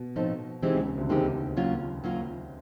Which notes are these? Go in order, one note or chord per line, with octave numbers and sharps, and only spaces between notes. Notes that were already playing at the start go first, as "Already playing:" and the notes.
Already playing: B2
A2 F3 A3 C4 D#4
C3 E3 G#3 C4 D#4 G4
C#2 C#3
C3
D2 D3
D#2 D#3 E3 G#3 C4 D#4 G4
F#3 A#3 C#4 F4
F#3 A#3 C#4 F4